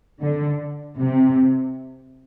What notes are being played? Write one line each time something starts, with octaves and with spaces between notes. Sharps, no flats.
D3
C3